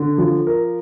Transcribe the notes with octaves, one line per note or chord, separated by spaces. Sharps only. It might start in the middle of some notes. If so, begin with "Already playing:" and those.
Already playing: D3
F3
A#4